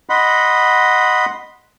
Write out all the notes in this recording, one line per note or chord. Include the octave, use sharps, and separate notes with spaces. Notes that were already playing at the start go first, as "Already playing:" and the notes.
D#5 F#5 B5 C6